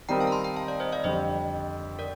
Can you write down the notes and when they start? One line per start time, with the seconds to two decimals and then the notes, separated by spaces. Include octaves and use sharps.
0.09 D#3 G3 C4 D#4 A#4 G5 A#5
0.20 F5 A5
0.27 A#5
0.32 A5 C6
0.44 G5 A#5
0.56 F5 A5
0.68 D5 F5
0.80 C5 D#5
0.92 D5 F5
1.04 F2 D3 G3 C5 D#5
1.99 A#4 D5